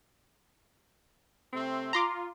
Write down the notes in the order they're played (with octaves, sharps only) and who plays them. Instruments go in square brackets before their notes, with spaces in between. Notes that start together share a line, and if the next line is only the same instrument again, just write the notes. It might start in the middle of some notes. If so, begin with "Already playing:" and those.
[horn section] C3 A3 C4
[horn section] F4 [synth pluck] A#5 C6 D6